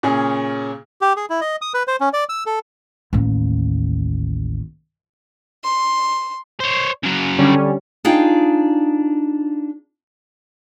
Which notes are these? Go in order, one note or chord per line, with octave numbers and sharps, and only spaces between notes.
A#2 C#3 C#4 G#4
G4
G#4
E4
D#5
D#6
B4
C5
C#4
D5
E6
A4
A1 D#2
C6
C5 C#5
C#3 F#3
D3 G3 C#4
D4 D#4 F4 G#4 G5